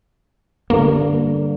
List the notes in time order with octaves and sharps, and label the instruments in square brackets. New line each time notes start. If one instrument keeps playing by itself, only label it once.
[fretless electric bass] G2 D3 [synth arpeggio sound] A#3